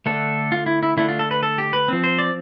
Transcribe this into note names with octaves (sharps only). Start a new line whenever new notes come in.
D3 A3 D4 A4
F4
E4
E4
D3 A3 D4 E4
F4
A4
B4
A4
G4
B4
F3 C4
C5
D5